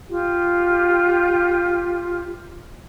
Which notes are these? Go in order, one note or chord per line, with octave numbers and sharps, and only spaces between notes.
F4 G4